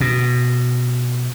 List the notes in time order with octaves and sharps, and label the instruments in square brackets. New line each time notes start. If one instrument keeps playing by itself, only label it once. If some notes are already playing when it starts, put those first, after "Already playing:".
[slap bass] B2